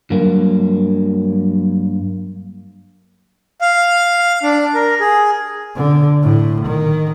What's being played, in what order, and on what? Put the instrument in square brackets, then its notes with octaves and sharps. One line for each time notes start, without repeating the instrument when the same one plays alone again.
[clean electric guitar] G2 A#3 [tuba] F#3
[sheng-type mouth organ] F5
D4
A#4
G#4
[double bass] D3
A2
D#3